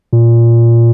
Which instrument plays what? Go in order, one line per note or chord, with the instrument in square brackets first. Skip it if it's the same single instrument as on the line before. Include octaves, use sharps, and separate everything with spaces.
[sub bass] A#2